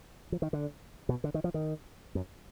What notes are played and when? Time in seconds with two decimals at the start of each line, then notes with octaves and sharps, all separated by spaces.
0.32 F3
0.42 D#3
0.53 D3
1.09 B2
1.24 D3
1.34 D#3
1.44 F3
1.54 D#3
2.15 F#2